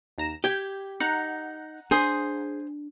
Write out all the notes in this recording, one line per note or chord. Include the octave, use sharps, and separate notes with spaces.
D#2 A#5 E7
G4 G6 G#6 B6
D#4 F#5 A#5 F#6
D4 G#4 C5 G#5 D#6